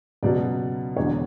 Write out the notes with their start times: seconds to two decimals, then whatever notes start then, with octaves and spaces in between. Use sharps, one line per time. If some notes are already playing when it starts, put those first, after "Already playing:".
0.23 C#2 B2 F#3 D5
0.96 E1 E2 D3 F#3 C#5